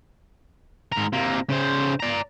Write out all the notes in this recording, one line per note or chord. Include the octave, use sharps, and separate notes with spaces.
G#2 A#4
C3 A#3
C#3 C5
D5 A#5